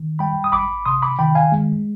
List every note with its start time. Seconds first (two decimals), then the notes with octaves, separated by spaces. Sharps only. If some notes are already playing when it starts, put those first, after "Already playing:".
Already playing: D#3
0.19 G3 G5 B5
0.44 D#6
0.52 G#1 B5 D6
0.86 C3 C6 D#6
1.02 B5 D6
1.19 D#3 G5 B5
1.35 F5 G#5
1.52 G#3